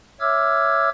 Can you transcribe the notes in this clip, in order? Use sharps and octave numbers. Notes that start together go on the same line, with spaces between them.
C#5 E5 D6 E6 F6 G#6